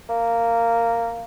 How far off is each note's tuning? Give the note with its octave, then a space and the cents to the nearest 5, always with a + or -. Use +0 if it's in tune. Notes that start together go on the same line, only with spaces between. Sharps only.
A#3 -10